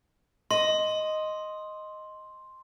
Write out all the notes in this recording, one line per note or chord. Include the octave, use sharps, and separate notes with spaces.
D#5 C6